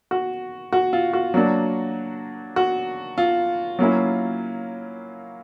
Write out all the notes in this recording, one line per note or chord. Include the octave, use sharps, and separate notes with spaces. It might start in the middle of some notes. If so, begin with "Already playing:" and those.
F#4
F#4
F4
F#4
F#3 A#3 D4
F#4
F4
F#3 A#3 C#4 E4